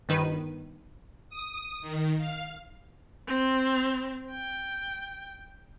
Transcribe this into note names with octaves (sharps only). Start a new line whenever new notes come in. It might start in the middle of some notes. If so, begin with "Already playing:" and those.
G1 D#3 B4 D#7
D#6
D#3
F5
C4
G5